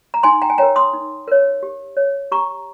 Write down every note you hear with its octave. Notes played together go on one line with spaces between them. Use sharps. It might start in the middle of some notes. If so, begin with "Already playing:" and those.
A#5
D#4 G#5 C6
G5 A#5
G#5
A#4 C#5 G5 A#5
C6 D#6
D#4
A#4 C#5
G4
C#5
G4 A#5 C#6